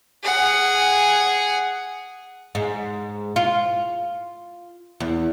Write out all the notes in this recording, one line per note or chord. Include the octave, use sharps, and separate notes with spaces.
G#4 F#5
G#2
F4
E2